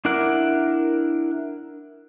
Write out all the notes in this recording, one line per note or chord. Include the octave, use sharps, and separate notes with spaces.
D4 E4 A#4 F#5 D6